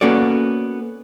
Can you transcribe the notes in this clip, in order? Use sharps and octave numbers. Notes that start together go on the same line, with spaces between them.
A#3 B3 C#4 F#4 A4 D5